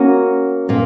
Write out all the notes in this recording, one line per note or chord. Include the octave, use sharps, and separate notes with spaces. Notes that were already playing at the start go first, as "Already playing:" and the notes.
Already playing: A#3 C#4 F#4
A#2 A#3